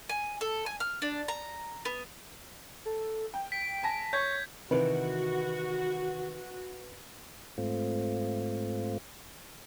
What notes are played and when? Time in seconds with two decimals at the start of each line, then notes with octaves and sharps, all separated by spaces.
0.09 G#5
0.41 A4
0.66 G#5
0.80 F6
1.02 D4
1.28 A#5
1.85 B3
2.85 A4
3.34 G5
3.52 B6 D7
3.83 G#5 A5 A#6
4.13 C#5 C#6 G6 G#6 B6
4.71 C3 D#3 E3 F#4 B4
7.58 G#2 A3 C4 F4